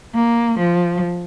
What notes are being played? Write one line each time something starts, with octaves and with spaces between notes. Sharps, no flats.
A#3
F3